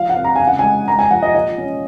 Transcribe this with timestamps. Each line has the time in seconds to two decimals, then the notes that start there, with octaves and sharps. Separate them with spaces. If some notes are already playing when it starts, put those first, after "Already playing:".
Already playing: F3 F5
0.09 F#5
0.16 C4
0.24 A#5
0.36 C#3 G#5
0.47 F#5
0.59 G#3 G#5
0.88 G#3 A#5
0.99 G#5
1.11 F3 F#5
1.23 D#5
1.34 A#2 D#5
1.58 C#4